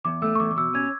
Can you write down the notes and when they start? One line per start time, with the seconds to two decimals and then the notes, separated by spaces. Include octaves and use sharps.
0.05 E2 D6
0.22 A3 E6
0.35 C#6
0.40 E2 D6
0.51 D6
0.57 B2 E6
0.75 C#4 G#6